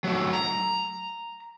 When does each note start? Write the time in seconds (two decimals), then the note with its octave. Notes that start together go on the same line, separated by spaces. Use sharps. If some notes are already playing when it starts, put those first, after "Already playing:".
0.04 F#3 A3
0.33 A#5